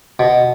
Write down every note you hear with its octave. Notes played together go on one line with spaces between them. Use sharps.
B2